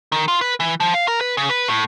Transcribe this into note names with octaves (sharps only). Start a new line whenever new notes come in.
D#3
F4
B4
E3
F3
F5
A#4
B4
C#3
B4
A2